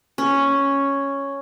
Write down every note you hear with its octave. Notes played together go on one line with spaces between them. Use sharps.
C#4